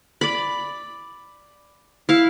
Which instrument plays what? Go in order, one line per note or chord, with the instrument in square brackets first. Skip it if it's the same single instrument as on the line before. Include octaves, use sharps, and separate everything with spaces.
[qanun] D5 B5
E4 F5